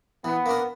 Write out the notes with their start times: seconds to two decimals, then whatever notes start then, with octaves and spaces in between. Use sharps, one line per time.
0.24 E3 B3
0.46 A#3 D4 A#4